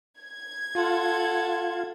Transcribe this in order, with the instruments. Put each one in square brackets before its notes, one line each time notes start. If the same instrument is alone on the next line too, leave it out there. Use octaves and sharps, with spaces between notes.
[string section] G#6
[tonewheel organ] F4 [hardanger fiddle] A4 F#5